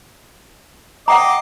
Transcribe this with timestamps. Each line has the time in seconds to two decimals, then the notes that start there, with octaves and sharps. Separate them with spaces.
1.08 D#5 F#5 G5 A#5 D6